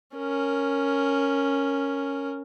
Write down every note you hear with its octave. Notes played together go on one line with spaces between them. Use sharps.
C#4 A#4